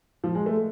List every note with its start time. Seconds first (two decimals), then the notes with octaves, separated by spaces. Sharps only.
0.24 F3
0.35 G#3
0.46 A3